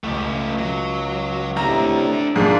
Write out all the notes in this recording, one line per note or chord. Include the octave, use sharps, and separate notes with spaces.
C#2 A3 G4
F#3
A2 C3 D4 E5 A#5
G#2 F3 A#3 D4 D5